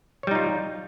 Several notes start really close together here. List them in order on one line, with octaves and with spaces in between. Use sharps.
C#5 G3 D#4 F4